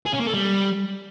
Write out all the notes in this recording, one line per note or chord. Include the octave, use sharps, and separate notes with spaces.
G#4
C#4
A#3
A4
G3